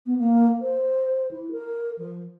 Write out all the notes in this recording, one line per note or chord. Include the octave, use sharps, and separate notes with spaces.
B3
A#3
C5
E4
A#4
F3